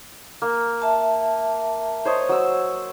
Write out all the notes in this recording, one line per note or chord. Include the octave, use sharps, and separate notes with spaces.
A#3
E5 A5
C5 C#5 D#5
F#3 E6